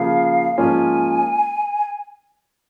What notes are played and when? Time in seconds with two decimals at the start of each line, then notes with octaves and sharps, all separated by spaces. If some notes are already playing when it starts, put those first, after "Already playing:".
Already playing: C#3 F3 A#3 F5
0.57 G#2 F3 A#3 C#4 F4 G#5